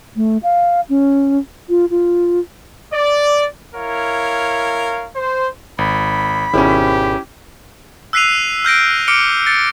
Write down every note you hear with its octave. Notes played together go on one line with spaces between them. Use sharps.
A3
F5
C#4
F4
F4
D5
E4 A#4 C#5 F5
C5
G#1 B5
G#1 B2 C#4 E4 G4
E6 F#6 B6 C7 D#7 F7
F6 G6 A#6 D7
D6 F6 C#7 D7 G7
A6 C#7